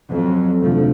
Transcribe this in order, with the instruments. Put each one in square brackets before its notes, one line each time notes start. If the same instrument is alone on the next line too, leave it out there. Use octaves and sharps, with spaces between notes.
[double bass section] F2 F#3
F1 D2 F3 A3